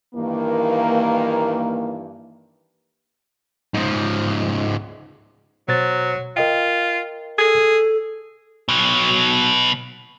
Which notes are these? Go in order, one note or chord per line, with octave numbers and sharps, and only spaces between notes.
G2 D#3 E3 A#3
G#2 F3
B2 F#3 C5 A6
F4 A#4 D#5 G5
G#4 A4
B2 F#3